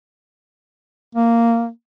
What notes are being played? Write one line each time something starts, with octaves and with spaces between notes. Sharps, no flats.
A#3